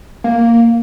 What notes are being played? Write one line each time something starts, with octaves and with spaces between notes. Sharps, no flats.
A#3